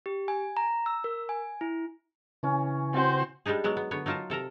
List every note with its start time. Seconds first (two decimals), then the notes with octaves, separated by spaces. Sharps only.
0.06 G4
0.28 G#5
0.57 A#5
0.86 E6
1.04 A#4
1.29 G#5
1.61 E4
2.43 C#3 E3 C#4
2.94 C4 F#4 C5
3.46 G3 G#3 D4 D#4 G#4
3.64 F#3 G#3 B3
3.77 B3
3.91 D3 B3 C#5
4.06 F#3 D#4 F4 A#4 A5
4.30 C3 A4 A#4 A#5